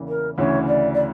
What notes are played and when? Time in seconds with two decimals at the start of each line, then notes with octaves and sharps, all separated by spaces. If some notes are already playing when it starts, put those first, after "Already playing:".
Already playing: E2 C#3 E3 A#3
0.08 A#4
0.38 D2 C#3 E3 C#5
0.67 D5
0.94 D5